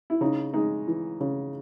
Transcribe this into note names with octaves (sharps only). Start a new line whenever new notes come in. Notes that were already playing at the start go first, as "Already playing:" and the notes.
E4
C#3 D#4
G#3 D#4
E3
C#3